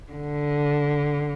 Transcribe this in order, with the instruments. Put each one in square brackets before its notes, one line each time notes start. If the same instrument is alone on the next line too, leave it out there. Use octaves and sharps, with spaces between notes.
[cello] D3